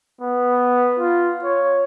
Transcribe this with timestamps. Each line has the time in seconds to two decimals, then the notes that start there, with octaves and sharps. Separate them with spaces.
0.21 B3
0.99 F4
1.44 C#5